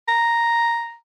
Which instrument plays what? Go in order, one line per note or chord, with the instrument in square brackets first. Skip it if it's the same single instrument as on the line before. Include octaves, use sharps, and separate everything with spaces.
[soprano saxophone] A#5